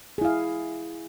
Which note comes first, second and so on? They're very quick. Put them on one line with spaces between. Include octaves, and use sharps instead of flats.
G#4 E4 F5